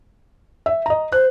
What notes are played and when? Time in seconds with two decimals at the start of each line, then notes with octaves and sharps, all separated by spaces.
0.66 E5
0.86 D#5 A#5
1.12 C5 F#6